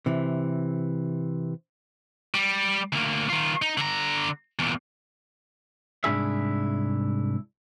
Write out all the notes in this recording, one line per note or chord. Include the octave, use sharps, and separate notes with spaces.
C3 E3
G3
D2 A#3
D#3 F4
D#4
D3 A#5
E2 A#2
C2 G#2 D4 E4 G#4 E5